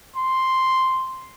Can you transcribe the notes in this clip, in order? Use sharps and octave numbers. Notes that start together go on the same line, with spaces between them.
C6